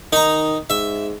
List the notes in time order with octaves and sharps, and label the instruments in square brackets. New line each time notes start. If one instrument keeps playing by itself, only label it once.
[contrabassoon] D#3 [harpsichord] D#4 A#5
[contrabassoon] G#2 [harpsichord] E5